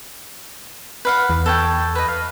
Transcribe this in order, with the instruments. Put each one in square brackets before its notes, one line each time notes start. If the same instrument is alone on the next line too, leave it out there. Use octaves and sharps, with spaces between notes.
[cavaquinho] B4 F5 F#5
[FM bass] E2
[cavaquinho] A4 C#5 G5
B4 D#5
F5